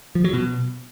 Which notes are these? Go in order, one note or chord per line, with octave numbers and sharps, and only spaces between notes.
F3
F#3
B2